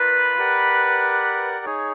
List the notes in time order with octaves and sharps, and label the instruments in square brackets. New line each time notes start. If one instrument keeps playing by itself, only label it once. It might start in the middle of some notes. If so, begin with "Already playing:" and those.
Already playing: [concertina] F4 A#4 D5 F5 [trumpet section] B4
[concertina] G4 A#4 D5 F#5
D#4 G#4 C#5